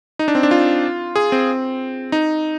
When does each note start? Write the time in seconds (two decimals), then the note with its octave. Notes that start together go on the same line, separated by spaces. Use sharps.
0.19 D#4
0.28 D4
0.35 C4
0.43 D4
0.51 F4
1.16 G#4
1.32 C4
2.12 D#4